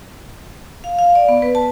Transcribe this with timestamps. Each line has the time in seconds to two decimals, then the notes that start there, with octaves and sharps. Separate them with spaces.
0.84 F5
0.99 F5
1.15 D5
1.28 B3
1.42 B4
1.55 A5